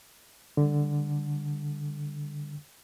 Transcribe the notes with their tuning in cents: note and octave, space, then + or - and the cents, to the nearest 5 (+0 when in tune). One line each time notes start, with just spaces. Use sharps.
D3 +0 G3 +25